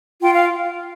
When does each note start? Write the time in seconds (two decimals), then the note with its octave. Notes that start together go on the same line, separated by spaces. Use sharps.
0.22 F4 G5
0.34 F5